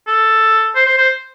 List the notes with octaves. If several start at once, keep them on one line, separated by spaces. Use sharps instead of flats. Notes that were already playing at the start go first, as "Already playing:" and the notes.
A4
C5
C5
C5